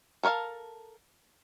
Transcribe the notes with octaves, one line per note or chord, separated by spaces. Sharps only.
A4 A#4 C#5 F5 A5